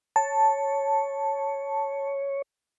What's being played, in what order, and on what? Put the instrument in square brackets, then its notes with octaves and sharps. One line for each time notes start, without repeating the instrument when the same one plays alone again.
[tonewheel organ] C#5 [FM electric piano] A5